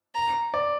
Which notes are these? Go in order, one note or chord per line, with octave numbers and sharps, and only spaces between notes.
A#5
D5